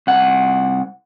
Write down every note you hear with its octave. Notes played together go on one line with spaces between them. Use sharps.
C2 F#5